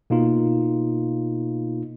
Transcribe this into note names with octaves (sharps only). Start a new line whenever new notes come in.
B2 A#3 D#4 F4